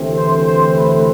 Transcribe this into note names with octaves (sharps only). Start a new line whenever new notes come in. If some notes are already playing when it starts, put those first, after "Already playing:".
Already playing: D2 C3 E3 A3 C4
C5
C5
B4